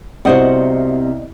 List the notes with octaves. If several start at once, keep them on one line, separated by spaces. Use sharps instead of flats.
C2 C3 B3 F#4 C5 D5 D#5 F#5